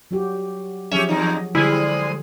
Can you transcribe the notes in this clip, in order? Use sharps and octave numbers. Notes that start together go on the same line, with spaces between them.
F#3 F#4 G4
F3 F#3 C#4 G4 G#4 E5
E2 D#4
D3 G3 G#3 E4 G#4 C5 D#6